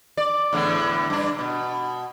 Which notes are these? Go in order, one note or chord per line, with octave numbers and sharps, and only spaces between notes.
D5
E2 A2 D3
G2 D4
B2